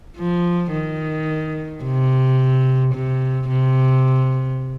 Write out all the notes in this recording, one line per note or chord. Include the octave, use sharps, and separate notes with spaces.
F3
D#3
C3
C3
C3